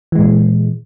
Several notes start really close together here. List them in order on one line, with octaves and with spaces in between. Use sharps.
E3 G#3 A#2